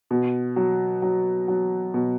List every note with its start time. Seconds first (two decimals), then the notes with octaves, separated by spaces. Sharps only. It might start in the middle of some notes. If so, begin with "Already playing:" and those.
0.11 B2
0.56 F#3
1.02 F#3
1.48 F#3
1.94 B2